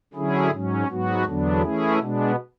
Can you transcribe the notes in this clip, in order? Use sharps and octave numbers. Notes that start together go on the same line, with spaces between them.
D3 F#3 C#4 E4 G#4
G#2 F#3 C#4
G#2 F#3 B3 F#4
E2 D3 F#3 B3 D4
E3 A3 C#4 E4 G#4
B2 G#3 B3 D4